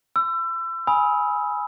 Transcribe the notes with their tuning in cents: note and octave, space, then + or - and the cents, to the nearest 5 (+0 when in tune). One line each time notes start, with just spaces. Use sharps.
C6 -45 E6 +30
G#5 +0 B5 -10 D#6 +45